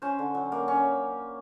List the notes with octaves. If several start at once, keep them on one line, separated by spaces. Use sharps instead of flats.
C#4 C5
D3
F#3
A#3
C#4